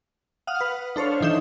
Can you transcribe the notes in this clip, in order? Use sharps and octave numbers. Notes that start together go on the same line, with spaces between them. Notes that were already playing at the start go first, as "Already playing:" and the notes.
F5 F#5 D#6 F6
B4
D4 A4 C5 C#5 F5
D#3 E3 D#4 G6 E7